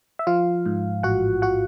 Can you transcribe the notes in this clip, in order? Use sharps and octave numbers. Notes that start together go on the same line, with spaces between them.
E5
F3 F4 F5
G#2
A1 F#4 F#5
F#4 F#5